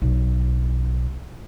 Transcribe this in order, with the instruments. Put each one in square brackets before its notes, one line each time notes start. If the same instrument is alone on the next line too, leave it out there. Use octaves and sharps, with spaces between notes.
[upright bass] B1